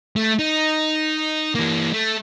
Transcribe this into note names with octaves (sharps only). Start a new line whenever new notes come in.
A3
D#4
E3 A#3
A3